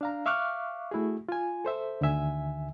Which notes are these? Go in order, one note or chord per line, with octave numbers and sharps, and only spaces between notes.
D4 F5 A#5
E5 F5 C#6 D6 F6 F#6
A3 E4 F#4 G#4
F4 G#5
A4 C5 E5
D2 D3 D#3 E5 G#5